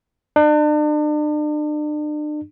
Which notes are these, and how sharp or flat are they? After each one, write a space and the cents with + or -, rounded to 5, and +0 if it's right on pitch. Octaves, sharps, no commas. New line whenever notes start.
D4 +40